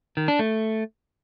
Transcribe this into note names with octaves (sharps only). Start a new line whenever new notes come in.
D#3
D4
A3